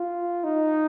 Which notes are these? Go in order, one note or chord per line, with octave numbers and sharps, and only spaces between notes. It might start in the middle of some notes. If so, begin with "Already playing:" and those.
Already playing: F4
D#4